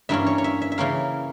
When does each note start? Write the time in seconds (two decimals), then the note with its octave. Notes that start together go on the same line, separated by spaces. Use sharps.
0.09 G2 E3 A#3 C#4 E5
0.26 C#5
0.38 C#5
0.44 E5
0.62 E5
0.72 E5
0.78 C#3 E3 A#3 C#4 F5